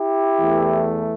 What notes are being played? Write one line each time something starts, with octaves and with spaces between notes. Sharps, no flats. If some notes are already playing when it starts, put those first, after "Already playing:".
Already playing: E4 G4
E2 E3 A3